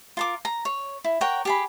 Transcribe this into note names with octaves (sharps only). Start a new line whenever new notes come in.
F4 A#4 D6
A#5
C#5
E4
A#4 C#5 F#5 G5
G4 G#4 B5